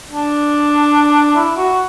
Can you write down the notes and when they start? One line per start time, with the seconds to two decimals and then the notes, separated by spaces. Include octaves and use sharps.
0.11 D4
1.36 E4
1.57 F#4